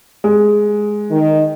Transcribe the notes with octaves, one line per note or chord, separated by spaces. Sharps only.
G#3
D#3